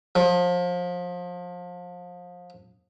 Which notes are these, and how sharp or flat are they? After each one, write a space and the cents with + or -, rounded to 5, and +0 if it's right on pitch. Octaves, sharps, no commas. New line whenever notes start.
F3 +30